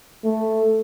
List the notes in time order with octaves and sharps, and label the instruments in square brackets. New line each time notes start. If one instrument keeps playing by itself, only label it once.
[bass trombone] A3